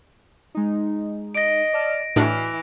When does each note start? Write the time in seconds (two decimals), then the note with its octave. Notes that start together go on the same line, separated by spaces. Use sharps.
0.55 G#3 D#4
1.35 D#5 A#6 D7
1.73 D5 A5 F6
2.16 A2 E3 D4 F#4 F6